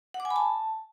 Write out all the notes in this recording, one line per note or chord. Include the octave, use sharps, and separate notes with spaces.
F#5
D6
G#5
B5
A5